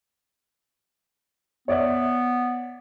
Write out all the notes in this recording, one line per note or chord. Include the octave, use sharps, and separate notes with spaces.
B3 C#5 D5 E5